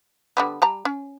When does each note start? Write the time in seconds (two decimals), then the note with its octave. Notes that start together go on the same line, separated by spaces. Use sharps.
0.37 D3 G3 B3
0.62 G3 A5 A#5
0.85 C#4